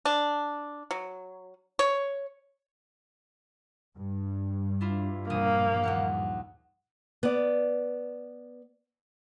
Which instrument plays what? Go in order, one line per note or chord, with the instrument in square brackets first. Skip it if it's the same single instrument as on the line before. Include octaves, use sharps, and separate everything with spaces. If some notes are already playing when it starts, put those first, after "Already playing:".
[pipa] D4
F#3
C#5
[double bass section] G2
[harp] D4 E4 F4
[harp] E1 A#1 D#6 [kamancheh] A#3
[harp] D#2 G4 F#5
[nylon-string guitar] B3 D5